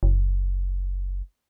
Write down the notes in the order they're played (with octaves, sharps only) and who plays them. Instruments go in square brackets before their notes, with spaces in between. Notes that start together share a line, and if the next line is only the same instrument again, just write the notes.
[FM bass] F#1